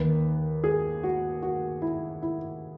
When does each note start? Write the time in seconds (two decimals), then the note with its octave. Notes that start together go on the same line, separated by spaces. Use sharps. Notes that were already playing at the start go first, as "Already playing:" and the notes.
Already playing: D#2 D#3 B4
0.64 G#4
1.03 F#4
1.43 F#4
1.82 E4
2.22 E4